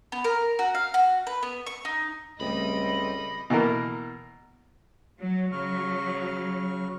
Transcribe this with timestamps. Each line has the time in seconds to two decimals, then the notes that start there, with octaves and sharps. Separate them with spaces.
0.12 B3
0.24 A#4
0.59 F#4
0.75 F5
0.94 F#4
1.27 B4
1.43 B3
1.67 C#6
1.85 D#4
2.40 C#2 G3 A3 C4 D#5 B5
3.50 B2 E3 A#3 A#4
5.20 F#3
5.52 C#3 F#3 C#6 F6